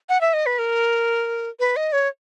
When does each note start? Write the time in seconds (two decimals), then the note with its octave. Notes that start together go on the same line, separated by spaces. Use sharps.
0.09 F#5
0.21 E5
0.33 D#5
0.46 B4
0.59 A#4
1.60 B4
1.76 D#5
1.93 C#5